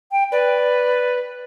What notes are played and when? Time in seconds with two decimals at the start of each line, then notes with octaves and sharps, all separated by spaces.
0.12 G5
0.32 B4 D5